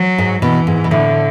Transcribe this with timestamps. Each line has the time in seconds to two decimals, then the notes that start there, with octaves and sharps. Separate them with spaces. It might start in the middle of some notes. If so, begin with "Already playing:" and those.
Already playing: F#3
0.18 G#2
0.42 B2 E3
0.67 G#2
0.84 B2
0.91 A2 D3